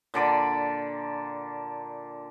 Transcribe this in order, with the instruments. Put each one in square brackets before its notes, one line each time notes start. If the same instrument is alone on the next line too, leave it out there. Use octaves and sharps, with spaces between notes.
[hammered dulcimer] A#2 D3 D5 B5